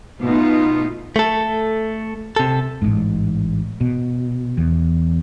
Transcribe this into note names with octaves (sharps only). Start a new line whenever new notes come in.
B2 A3 B3 D#4 F4
A3 A4
C3 A4
A1 G#2
B2
E2